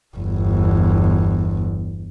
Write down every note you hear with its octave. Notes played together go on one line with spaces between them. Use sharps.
G1 E2